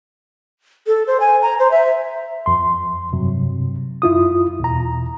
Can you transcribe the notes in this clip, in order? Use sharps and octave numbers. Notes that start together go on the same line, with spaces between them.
A4
C5
G#5
A#5
C5
E5
F2 C6
G2 C3 F#3
F#2 E4 F4 D#6
E2 B2 A#5